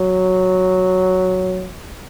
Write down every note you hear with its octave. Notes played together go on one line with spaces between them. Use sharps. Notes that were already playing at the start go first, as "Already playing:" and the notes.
Already playing: F#3